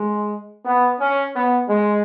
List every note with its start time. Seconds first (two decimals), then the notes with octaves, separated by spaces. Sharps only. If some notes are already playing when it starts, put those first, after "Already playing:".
Already playing: G#3
0.64 B3
0.99 C#4
1.34 B3
1.69 G#3